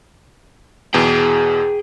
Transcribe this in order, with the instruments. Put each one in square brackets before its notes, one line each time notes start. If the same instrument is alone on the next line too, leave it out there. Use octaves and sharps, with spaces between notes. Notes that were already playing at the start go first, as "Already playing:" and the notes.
[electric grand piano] E2 B2 [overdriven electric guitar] G#4 G5